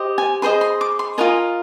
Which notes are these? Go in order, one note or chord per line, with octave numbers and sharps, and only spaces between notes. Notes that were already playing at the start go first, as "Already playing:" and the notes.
Already playing: G4 C5 D#5
G#5
G#4 C5 D#5 C6
C6
D6
C6
F4 A#4 D#5 G#5